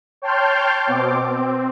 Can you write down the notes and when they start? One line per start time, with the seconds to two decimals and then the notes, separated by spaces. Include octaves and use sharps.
0.22 C#5 G5 A5 C6 F6 G6
0.87 B2 C4 D6
1.27 C4